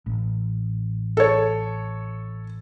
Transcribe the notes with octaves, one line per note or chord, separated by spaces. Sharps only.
A1
A4 C#5